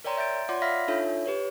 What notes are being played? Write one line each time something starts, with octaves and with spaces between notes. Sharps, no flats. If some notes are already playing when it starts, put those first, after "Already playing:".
A#4 C#5 D5 G5 A#5 C6
E5 G6 A6 D7
F4 C#5 D5 F#5 C6 D6
E5 F5 B5 F6 A#6 B6
D4 D#4 F4 A4 C#5 E5
G4 B4 C#5